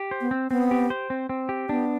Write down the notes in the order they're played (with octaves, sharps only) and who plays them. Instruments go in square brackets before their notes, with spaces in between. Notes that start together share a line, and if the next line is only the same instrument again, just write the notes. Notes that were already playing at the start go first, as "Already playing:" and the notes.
Already playing: [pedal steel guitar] G4
C5
[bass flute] B3
[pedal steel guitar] C4
[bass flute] B3 [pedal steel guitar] C4
[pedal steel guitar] G4
C5
C4
C4
G4
[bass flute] B3 [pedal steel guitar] D4